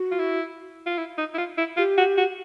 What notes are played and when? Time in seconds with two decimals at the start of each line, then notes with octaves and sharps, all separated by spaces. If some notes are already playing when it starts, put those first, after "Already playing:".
Already playing: F#4
0.12 F4
0.19 E4
0.86 F4
0.98 E4
1.18 D#4
1.34 E4
1.38 F4
1.58 E4
1.77 F4 G4
1.98 F#4
2.18 F#4